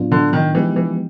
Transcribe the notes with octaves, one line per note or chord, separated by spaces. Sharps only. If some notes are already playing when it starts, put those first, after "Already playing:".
Already playing: A2 F#3 B3 D4 F4
D3
D#3
E3 F3 G#3 B3 D#4 G4
E3